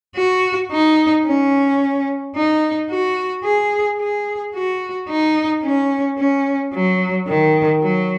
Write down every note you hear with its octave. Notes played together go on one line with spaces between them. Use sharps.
F#4
D#4
C#4
D#4
F#4
G#4
G#4
F#4
D#4
C#4
C#4
F#3
D#3
F#3